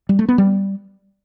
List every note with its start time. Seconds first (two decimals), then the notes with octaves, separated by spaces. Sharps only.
0.09 G3
0.19 A3
0.28 B3
0.38 G3